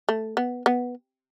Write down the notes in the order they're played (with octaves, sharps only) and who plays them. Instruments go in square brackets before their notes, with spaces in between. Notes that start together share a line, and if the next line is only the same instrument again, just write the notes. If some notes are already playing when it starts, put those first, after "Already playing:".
[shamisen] A3
B3
B3